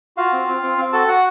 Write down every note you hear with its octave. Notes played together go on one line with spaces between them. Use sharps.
F4 F#4 F5
C4
C4
C4
C4
F#4 A4 A5
F#4 F#5